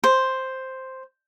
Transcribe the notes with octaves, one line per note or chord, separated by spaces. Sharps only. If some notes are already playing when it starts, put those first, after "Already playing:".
C5